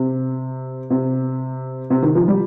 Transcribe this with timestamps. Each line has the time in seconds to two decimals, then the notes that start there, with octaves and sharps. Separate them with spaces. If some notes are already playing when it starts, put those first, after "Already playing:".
Already playing: C3
0.90 C3
1.90 C3
2.02 D#3
2.15 F3
2.28 G3